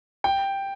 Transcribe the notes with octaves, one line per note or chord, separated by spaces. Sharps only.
G5